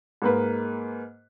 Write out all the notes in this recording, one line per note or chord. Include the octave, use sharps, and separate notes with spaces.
G#2 A#3 B4